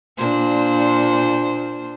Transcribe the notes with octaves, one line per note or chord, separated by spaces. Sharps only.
A#2 D4 C5